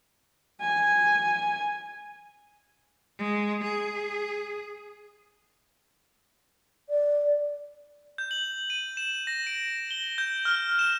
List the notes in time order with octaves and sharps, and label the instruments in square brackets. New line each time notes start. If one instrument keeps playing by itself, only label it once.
[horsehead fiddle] G#5
[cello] G#3
G#4
[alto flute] D5
[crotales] G6
F#7
D#7
E7
A#6
D7
G7
G6
F6
E7